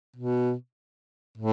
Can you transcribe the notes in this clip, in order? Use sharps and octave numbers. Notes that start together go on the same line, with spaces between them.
B2
A2